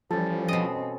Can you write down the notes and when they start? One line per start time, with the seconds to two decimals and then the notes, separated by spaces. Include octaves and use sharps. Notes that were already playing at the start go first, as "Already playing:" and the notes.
0.11 E3 F3 G3 C#4 A4
0.48 B2 C4 D#5